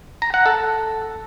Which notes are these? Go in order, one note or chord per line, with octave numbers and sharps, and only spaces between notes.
A#5
F#5
A4